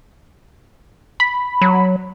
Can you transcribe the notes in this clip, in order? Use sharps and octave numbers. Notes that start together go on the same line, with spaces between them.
B5
F#3